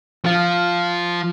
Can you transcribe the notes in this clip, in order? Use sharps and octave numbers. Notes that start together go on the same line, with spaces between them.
F3 F4